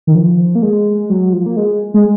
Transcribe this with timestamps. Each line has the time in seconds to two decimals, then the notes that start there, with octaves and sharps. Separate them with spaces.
0.07 D#3
0.15 F3
0.55 A#3
0.62 G#3
1.10 F#3
1.33 F3
1.46 A#3
1.57 G#3
1.94 G#3